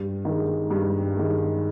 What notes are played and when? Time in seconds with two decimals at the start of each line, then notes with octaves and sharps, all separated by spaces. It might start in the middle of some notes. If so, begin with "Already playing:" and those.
Already playing: G2
0.25 D#3 G#3
0.70 G2
1.16 D#3 G#3